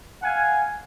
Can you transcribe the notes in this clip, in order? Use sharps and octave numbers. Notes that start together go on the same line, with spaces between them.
F5 F#5 G#5